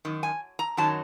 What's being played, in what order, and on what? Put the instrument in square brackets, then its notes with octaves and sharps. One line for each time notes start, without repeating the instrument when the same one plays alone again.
[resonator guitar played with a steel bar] F#2 D#3
G#5
A#5
F#2 D#3 F#3 A5